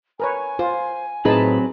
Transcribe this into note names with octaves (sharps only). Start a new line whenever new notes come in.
A#4 B4 C#5 G#5
F4 C5
A2 F#3 C4 D#4 G#4 B4 A5 B5